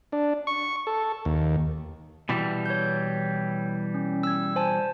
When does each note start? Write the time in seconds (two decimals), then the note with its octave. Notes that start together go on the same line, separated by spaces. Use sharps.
0.12 D4
0.47 C#6
0.87 A4
1.25 D#2
2.29 B2 E3 G3
2.66 C#5 G6
3.94 C#4
4.23 E6 G#6
4.56 C5 G#5 A5